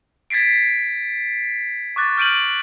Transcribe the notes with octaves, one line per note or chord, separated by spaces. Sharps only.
G#6 A6 B6 C7 D7
C#6 D6 F#6 A6
F6 G6 D7 D#7 F#7